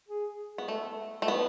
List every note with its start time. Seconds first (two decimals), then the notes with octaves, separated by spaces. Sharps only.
0.08 G#4
0.58 B3
0.68 A3 A4
1.22 A3
1.28 B3 B4